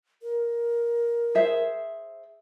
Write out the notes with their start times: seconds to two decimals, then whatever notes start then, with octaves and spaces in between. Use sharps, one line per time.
0.22 A#4
1.35 G#4 C5 E5